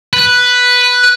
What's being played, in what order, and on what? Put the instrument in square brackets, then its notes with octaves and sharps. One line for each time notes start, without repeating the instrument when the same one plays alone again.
[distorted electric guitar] B4